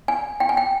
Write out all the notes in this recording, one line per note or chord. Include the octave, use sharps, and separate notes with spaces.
G#5
G5
G#5
G5